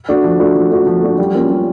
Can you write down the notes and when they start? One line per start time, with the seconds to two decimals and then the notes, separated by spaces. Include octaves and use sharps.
0.09 A3 D4 F#4
0.24 F3
0.40 A3 D4 F#4
0.56 F3
0.71 A3 D4 F#4
0.87 F3
1.02 A3 D4 F#4
1.18 G3
1.34 A#3 C#4 F4
1.50 G3